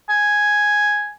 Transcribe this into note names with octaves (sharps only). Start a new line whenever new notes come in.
G#5